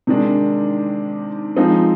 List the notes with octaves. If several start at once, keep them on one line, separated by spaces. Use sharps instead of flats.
C3 D#3 G#3 D4
F3 G#3 C4 D#4